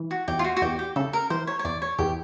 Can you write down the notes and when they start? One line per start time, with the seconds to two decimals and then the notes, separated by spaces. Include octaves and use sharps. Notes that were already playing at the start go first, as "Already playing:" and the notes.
Already playing: E3
0.11 F#4
0.28 E2 G4
0.39 F4
0.44 F#4
0.57 F#4
0.62 E2 G4
0.79 G4
0.96 C#3 A4
1.13 A#4
1.30 E3 C5
1.47 C#5
1.59 C#5
1.65 E2 D5
1.82 C#5
1.98 E2 G4